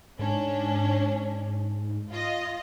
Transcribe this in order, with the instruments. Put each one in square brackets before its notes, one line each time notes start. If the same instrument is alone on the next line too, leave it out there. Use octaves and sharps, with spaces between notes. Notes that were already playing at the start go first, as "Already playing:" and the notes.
[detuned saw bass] G#2 [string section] C#4 D4
[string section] F4 D#5